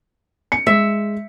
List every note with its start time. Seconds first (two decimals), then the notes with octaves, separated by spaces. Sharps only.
0.52 C#7
0.67 G#3 E5